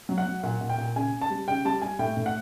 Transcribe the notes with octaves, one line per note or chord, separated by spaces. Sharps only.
F#3
F#5
F#3
A#2 F#5
A#2
G5
A#2
C#3 G#5
C#3
A5
G3
C#3 G5
G3 A5
G3 G#5
A2 G5
A2
F#5